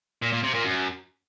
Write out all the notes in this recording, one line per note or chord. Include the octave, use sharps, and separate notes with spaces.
A#2
A#2
C3
A#2
F#2